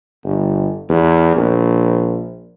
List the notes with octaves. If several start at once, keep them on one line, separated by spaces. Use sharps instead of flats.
G1
E2
A#1